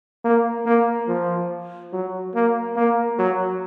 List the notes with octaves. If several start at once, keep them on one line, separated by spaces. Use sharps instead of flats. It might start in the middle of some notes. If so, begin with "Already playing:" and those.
A#3
A#3
F3
F#3
A#3
A#3
F#3